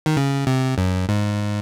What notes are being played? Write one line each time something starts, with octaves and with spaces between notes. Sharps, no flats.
D#3
C#3
C3
F#2
G#2